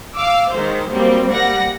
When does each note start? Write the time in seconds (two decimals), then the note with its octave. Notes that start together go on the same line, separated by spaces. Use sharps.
0.15 F5 D6 E6
0.52 D#3 G#3 C5
0.91 F#3 G3 A#3 C4
1.28 G3 A#3 F#5 A#6